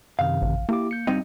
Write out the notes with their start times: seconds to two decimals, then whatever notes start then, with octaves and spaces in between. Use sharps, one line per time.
0.19 F#2 C3 D#3 F5
0.42 A1
0.69 A#3 E4 G4 D6
0.91 G6 C#7
1.07 G2 C4 D#4